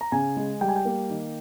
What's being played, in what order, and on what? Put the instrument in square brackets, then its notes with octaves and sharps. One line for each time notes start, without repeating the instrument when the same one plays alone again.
[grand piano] A#5
C#3 G#5
G#3
G3 G5
G#5
G5
A#3
D#3